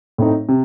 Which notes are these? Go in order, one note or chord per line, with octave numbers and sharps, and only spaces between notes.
A2 A3 C4 D#4
C3